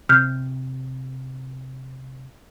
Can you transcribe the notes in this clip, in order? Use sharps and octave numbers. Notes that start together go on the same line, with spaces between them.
C3 F6 G6